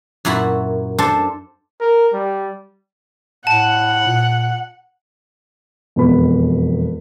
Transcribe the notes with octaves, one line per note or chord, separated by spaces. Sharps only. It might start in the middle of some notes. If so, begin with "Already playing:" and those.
F#2 A#2 E4 F#4 B5
D4 A4 C5
A#4
G3
A2 F#5 A5
A#2
E1 F2 B3 B5